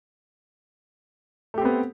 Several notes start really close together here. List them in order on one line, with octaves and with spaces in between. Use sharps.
A3 G4 C4 B3